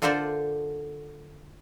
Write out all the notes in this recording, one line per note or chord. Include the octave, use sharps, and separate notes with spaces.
D3 F4 A4 A#4 C5 D5